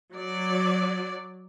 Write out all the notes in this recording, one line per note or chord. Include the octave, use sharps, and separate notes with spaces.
F#3 D5